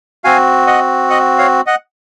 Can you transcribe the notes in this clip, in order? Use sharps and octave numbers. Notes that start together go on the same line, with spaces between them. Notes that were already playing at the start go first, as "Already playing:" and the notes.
C4 F#4 F5 G#5
D#5 F#5
D#5 F#5
C#5 F5
D#5 F#5